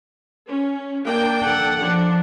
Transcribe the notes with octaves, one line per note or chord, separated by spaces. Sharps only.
C#4
A#3 D4 G5
A4 F#5
F3 D4